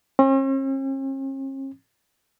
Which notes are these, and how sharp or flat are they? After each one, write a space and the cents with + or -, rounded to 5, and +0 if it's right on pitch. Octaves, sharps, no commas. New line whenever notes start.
C#4 -45